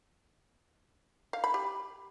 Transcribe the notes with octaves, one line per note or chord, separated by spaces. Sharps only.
F5
B5
G4